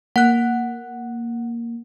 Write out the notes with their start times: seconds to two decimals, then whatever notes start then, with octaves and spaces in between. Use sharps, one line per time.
0.16 A#3 F#5 F#6